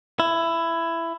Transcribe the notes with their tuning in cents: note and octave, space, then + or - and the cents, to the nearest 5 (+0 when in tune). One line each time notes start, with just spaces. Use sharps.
E4 +15